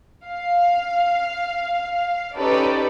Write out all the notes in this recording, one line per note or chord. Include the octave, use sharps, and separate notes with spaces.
F5
C#4 D#4 G4 A4 B4 D5